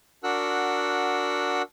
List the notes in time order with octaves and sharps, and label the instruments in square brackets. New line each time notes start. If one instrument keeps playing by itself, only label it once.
[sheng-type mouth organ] D4 F#4 A#4 F#5 E6 F#6